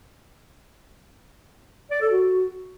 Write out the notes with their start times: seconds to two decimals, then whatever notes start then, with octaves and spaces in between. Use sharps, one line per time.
1.91 D5
2.01 A4
2.11 F#4